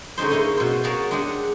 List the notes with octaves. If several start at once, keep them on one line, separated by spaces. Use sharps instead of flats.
D3 G#3 C#4 D#4 C5
A#3 D#4 E4 C#5 D#5
B2 C5
G#4 A#4 C#5 F5 F#5 A5
G#3 D4 G4 G#4 F#5